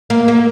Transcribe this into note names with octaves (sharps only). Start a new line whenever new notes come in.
A#3
A#3